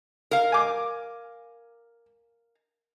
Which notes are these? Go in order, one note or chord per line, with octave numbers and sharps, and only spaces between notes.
A#4 F5
G#5 D6